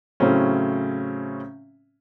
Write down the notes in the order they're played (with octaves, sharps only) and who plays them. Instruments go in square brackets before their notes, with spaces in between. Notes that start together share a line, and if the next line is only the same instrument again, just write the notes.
[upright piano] A2 C#3 F#3 A3 C4 C#4